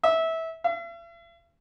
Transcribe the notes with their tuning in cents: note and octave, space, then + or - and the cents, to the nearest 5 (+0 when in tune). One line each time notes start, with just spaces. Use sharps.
E5 -20
E5 +45